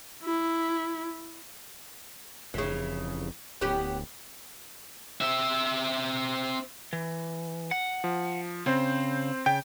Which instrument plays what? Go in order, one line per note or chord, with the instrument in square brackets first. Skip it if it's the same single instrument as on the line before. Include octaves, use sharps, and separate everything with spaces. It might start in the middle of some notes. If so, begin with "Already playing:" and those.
[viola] E4
[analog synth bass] F1 [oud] C#3 E3
[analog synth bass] D1 [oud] B3 C#4 G4
[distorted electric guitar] C4 E5
[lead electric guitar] E3
F#5
[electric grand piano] F3
[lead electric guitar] C#3 [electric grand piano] C4 C5
[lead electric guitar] C#3 [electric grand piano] G5